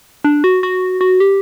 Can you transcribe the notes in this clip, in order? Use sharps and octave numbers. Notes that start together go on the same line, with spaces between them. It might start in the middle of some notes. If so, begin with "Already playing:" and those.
D4
F#4
F#4
F#4
G4